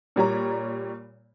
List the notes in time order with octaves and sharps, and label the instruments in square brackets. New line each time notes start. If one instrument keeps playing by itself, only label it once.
[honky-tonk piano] A#2 G3 C#5 A#5